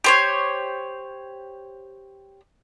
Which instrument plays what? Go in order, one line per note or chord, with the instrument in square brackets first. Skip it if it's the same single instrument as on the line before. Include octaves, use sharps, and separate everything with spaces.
[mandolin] G4 C5 C#5